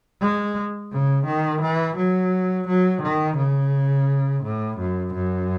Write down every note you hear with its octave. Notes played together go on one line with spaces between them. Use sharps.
G#3
C#3
D#3
E3
F#3
F#3
D#3
C#3
A2
F#2
F#2